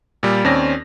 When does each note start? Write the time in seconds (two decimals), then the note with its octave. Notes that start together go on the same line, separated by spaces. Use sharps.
0.23 A#2 G3
0.45 D#2 C4 C#4 D5 A#6